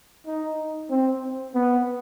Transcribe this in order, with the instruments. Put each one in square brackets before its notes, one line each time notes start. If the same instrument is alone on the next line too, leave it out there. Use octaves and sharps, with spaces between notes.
[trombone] D#4
C4
B3